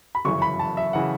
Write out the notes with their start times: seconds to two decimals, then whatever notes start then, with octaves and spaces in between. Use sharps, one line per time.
0.15 B5
0.25 G1 F#2 C#3 E3 C#6
0.42 B5
0.59 A5
0.77 E5
0.93 C#3 E3 F#5